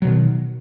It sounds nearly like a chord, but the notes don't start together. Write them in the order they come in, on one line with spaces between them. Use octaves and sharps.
F#3 B2 D#3